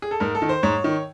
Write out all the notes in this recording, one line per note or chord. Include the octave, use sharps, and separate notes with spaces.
G#4
A4
G#2 A#4
A4
D#3
C5
G#2 C#5
D#3